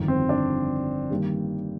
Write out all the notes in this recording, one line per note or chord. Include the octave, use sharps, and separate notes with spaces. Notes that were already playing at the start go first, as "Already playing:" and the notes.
Already playing: G1 F2 D#3
C4
D4
G2 D#3 G3 A#3